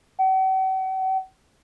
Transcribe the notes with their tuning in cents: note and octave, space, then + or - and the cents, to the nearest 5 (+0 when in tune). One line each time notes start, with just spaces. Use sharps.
F#5 +45